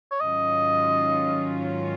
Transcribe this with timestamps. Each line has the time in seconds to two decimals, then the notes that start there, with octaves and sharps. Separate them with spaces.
0.11 C#5
0.20 G#2 D#3 F#3 C#4 F4 D#5